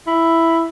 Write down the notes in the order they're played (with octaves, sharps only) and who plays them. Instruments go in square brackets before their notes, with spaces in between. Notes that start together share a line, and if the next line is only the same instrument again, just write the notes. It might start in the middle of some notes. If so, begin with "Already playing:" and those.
[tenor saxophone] E4